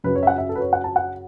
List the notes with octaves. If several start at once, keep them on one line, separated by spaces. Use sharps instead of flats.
F#2 C#3 F#3 B4
C#5
E5
F#5
E5
A4
B4
C#5
F#5
A5
F#5